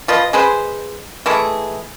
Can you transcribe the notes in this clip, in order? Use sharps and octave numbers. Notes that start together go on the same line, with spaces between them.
F3 F4 B4 D#5
G#3 G#4 B4 C5
E3 G#3 A3 G#4